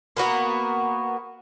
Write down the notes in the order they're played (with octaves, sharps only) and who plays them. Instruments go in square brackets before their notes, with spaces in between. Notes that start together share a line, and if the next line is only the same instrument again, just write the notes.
[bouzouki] A#3 B3 F#4 A#4